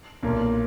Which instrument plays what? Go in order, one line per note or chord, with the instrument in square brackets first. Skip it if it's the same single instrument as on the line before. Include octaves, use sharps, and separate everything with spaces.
[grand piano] B1 A#2 A#3